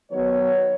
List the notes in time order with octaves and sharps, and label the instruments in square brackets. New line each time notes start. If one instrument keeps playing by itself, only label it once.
[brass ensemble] D#3 F#3 B3 C#5